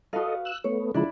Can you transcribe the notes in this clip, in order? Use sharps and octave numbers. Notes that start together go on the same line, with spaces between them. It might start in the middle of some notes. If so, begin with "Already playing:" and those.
F#4 A4 B4 D#5 F5
E6 F#6
A3 B3 C#5
C#3 F3 G#3 D4 E4 B5